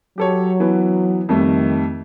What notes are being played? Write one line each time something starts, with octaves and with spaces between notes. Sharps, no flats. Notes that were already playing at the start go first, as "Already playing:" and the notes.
F#3 G4 A4 C#5
E3 B3
F2 D#3 G3 A3